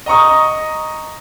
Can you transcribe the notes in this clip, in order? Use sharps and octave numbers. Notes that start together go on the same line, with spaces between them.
D#5 A#5 C#6 D#6